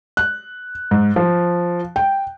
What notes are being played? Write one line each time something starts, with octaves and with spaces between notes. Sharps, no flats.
F#6
G#2
F3
G5